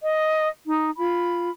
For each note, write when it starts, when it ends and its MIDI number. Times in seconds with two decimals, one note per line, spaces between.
0.03 0.48 75
0.65 0.90 63
0.99 1.50 65
0.99 1.50 83